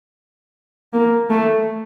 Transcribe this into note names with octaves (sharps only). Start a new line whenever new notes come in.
A#3
A3